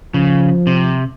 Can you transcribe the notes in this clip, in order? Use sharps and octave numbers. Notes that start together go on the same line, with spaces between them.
C#3 F3
C3